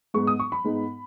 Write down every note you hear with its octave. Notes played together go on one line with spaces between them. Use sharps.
G#2 G#3 B3 D#4 C#6
D#6
C#6
B5
G#2 G#3 B3 D#4